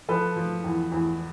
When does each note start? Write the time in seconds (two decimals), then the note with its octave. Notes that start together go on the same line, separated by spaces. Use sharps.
0.09 F3 A4 B4
0.36 F3
0.64 E2
0.92 E2